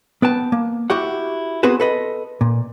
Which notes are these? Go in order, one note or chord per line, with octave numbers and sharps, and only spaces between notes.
B3 B4 G5 A5
A#3
E4 F#4 G4 F#5
B3 C4 F#4 G#4 B4 C5
A4 B4 D#5
A#2